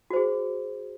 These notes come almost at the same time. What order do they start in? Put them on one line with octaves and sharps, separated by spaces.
F#4 C5 G#4